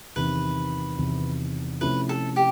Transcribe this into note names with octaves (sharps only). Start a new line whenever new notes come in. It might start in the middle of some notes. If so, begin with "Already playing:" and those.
E2 C3 D#3 B4
E2 C3 D#3
C3 F3 A3 C#4 E4 B4
A4
G4